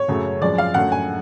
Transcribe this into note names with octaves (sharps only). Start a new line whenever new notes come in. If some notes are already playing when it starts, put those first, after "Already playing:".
Already playing: C#5
F#2 C#3 F#3 A3
F#2 F3 G#3 D5
F5
F#2 D3 F#3 A3 F#5
G#5